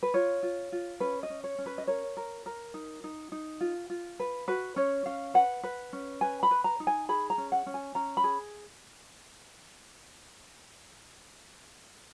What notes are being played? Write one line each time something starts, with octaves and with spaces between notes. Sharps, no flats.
B4
F4 C#5
F4
F4
C#4 B4
D#5
C#4
C#5
C#4
B4
D#5
A#4 C#5
A#4
A#4
D#4
D#4
D#4
F4
F4
B4
F#4 B4
C#4 C#5
C#4 F5
B4 F#5
B4
C#4
B4 G#5
B5
B4
A#5
D#4
G#5
G#4 B5
A#5
C#4
F#5
C#4
G#5
C#4 A#5
B5
G#4